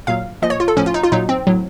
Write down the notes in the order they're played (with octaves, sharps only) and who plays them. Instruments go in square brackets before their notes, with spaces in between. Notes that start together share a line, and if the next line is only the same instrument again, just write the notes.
[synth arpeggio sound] A#2 F#3 F5
A#2 F3 D#5
C#5
F4
A4
A2 F3 C#4
F4
D#4
F4
A#2 F#3 D#4
C4
A2 F#3